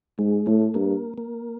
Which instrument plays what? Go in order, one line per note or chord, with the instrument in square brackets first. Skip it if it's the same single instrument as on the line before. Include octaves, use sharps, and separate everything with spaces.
[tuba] G#2 [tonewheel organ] G#3
[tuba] A2 [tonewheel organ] A3
[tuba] G2 [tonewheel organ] A#3
[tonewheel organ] A#3